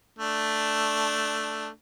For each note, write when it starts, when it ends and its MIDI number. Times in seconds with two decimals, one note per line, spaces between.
0.19 1.69 57
0.19 1.69 62